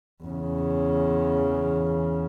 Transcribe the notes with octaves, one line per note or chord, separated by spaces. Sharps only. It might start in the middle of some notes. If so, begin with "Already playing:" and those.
E2 C#3